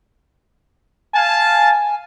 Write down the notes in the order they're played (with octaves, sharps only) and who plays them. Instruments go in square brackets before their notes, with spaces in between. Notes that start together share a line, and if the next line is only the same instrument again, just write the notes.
[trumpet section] F5 A5 [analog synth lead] G#5